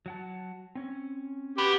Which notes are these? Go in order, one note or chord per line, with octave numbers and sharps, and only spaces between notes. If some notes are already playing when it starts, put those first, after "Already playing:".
F#3 F#5 A5
C4 C#4
F#4 G4 B4